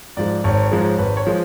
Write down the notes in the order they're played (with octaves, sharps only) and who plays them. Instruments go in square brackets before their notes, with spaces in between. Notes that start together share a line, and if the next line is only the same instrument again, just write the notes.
[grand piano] G#2 F3 G#3 D5
G#1 C#5
G#2 F3 G#3
G#1 B4
C#5
F3 G#3